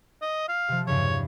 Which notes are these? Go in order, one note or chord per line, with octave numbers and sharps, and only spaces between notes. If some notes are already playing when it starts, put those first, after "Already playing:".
D#5
F5
C3 F3
E2 G2 C#3 C#5